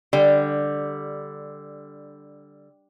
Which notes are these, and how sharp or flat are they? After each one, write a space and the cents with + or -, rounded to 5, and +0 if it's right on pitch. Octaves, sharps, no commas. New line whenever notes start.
D3 +0 G3 +5